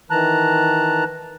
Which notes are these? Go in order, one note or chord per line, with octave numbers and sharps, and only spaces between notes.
D#3 E3 A5 A#5 F#6